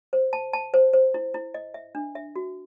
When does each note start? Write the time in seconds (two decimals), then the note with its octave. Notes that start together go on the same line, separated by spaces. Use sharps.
0.13 C5
0.33 A5
0.53 A5
0.74 C5
0.93 C5
1.14 E4
1.34 E4
1.54 D#5
1.74 E5
1.95 D4
2.15 E5
2.36 F#4